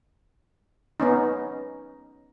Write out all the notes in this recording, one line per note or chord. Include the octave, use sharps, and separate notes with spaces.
B3 C#4 D#4